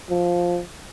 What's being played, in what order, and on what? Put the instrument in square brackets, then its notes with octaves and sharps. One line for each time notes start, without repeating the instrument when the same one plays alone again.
[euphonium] F3